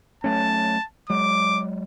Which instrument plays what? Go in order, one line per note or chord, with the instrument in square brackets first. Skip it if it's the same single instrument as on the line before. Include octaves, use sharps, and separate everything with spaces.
[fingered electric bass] F#3 A3 C#4 [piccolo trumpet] A5
[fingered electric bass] F#3 G#3 [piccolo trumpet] D6